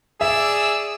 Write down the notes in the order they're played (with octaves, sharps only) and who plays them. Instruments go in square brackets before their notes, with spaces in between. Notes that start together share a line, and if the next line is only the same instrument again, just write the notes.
[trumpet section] G#4 D5 [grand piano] E5 [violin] E6